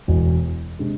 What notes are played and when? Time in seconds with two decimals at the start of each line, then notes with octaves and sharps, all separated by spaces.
0.08 E1 E2 B2
0.79 C3 G#3 D4